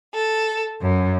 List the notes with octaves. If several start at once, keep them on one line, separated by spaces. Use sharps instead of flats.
A4
F#2